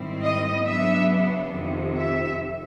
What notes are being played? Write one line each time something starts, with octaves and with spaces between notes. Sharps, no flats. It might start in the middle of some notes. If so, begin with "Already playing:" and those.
Already playing: G#2 D#3 G3 C4 E4
D#5
C#3 F#3 B3 D4 E5
F2 C3 D#3
E5